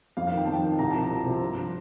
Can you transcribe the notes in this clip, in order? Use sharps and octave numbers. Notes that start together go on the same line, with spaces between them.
F2 F5
D#3 F5
G5
F2 A5
G5
D#3
C2 A#5
C3 F3 A5
A#5
C2
C3 F3
G2
F3